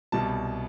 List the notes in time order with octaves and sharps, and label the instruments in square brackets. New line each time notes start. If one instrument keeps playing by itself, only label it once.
[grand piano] C2 B2 G3 A5